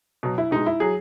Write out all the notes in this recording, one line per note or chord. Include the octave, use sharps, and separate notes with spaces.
B2 F#3
E4
B2 G#3 D#4
E4
F#3 G#4